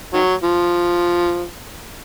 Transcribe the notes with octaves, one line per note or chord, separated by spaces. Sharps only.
D#3 F#3
F3